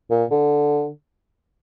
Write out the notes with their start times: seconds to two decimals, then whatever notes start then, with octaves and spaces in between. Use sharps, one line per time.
0.11 A#2
0.31 D3